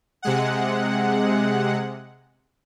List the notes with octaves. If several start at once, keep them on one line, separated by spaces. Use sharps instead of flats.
C3 G#3 F#5